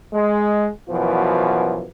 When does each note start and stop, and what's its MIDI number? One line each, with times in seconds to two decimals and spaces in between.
0.13 0.66 56
0.89 1.84 42
0.89 1.84 47
0.89 1.84 52
0.89 1.84 53